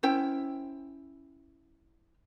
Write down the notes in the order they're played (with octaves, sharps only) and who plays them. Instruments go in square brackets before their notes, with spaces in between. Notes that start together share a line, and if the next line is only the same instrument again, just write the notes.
[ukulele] C#4 E4 C5 G5